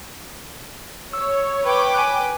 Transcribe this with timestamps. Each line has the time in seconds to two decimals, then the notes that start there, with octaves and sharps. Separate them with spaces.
1.13 C#5 E6
1.65 B4 G5 D6
1.94 G#5 F#6